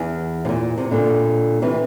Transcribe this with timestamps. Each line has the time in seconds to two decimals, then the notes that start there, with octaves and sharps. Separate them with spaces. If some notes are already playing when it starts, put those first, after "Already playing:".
Already playing: E2
0.45 C3
0.49 A#2
0.78 C3
0.91 A#2 D3
1.62 C3 E3